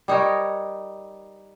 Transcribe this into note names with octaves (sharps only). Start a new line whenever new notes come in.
G3 D#4 A#4 C#5